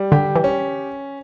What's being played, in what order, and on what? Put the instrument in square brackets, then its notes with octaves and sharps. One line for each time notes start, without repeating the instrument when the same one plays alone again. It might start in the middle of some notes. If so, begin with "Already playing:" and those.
Already playing: [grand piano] G3
[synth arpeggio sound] D3 [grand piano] G4
[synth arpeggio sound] E3
[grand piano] C#4